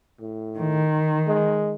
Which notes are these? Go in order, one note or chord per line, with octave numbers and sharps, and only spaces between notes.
A2
D#3
G#3